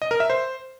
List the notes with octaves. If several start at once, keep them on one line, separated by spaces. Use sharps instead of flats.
D#5
A#4
E5
C5